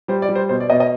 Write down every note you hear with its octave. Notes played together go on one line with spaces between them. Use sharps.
G3 C5
D5
G3
C5
B2 C5
D5
B2 D#5
D#5